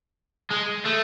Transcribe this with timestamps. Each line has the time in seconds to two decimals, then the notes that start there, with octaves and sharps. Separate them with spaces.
0.50 G#3
0.85 A3